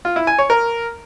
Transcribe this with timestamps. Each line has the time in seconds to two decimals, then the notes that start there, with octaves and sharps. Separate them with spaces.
0.05 F4
0.16 E4
0.27 G#5
0.39 C#5
0.50 A#4